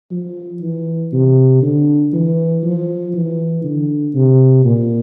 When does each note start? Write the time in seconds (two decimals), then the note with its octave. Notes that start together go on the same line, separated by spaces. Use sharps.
0.11 F3
0.62 E3
1.12 C3
1.63 D3
2.13 E3
2.64 F3
3.14 E3
3.64 D3
4.15 C3
4.65 A#2